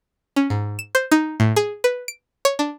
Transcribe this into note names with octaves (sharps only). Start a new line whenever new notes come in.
C#4
G#2
E7
C5
D#4
A2
G#4
B4
D7
C#5
D4